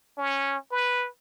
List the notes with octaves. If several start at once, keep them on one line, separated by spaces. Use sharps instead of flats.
C#4
B4